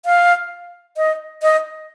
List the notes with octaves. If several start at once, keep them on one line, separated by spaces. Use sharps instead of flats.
F5
D#5
D#5